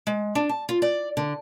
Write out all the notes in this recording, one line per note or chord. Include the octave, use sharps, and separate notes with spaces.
G#3
D4
A5
F4
D5
D3